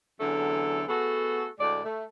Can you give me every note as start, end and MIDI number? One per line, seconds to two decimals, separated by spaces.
0.20 0.83 40
0.20 0.83 50
0.20 0.83 54
0.20 0.83 57
0.20 0.83 61
0.20 0.83 69
0.88 1.47 57
0.88 1.47 59
0.88 1.47 66
0.88 1.47 68
0.88 1.47 69
1.60 1.80 38
1.60 1.80 45
1.60 1.80 56
1.60 1.80 74
1.84 2.05 57